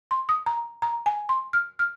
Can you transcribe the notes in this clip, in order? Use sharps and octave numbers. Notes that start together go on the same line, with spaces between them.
C6
D#6
A#5
A#5
G#5
C6
F6
F6